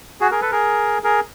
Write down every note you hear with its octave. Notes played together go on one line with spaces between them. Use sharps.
F#4 G#4
G#4 A#4
A4 B4
G#4 A#4
G#4 A#4